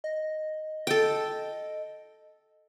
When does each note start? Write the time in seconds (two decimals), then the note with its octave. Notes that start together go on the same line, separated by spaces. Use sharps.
0.04 D#5
0.87 A4 G5